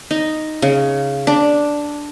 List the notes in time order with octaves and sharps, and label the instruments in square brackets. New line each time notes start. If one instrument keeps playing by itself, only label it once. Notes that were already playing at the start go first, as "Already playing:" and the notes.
[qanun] D#4
C#3
D4